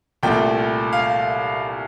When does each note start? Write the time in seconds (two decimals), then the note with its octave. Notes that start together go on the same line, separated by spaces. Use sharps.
0.23 C2 A#2 A3 G5
0.93 F5